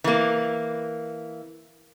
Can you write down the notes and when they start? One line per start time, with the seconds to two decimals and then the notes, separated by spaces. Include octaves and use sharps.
0.04 E3 A#3